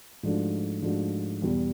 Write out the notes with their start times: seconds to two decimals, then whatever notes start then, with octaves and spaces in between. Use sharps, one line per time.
0.23 G#2 F3 A3 D4 F#4
0.82 G#2 F3 A3 D4 F#4
1.42 E2 B2 G3